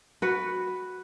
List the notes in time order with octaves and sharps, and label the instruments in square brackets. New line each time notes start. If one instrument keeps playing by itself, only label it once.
[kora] F#4 B4